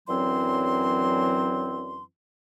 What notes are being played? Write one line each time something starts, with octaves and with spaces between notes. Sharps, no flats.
F#2 D3 E3 F#3 C4 C6